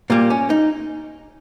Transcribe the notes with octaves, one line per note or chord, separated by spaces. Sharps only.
A#2 G3 A#3
C#4
D#4